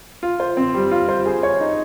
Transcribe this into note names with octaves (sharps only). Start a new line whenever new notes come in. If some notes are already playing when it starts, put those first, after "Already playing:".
F4
C5
C4
G3
F4
C5
G#4
C#5
D#4